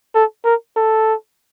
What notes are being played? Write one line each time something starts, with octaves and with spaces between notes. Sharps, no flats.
A4
A#4
A4